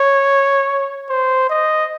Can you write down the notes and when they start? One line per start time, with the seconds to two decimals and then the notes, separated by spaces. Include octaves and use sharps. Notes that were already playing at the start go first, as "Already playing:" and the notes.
Already playing: C#5
1.09 C5
1.50 D#5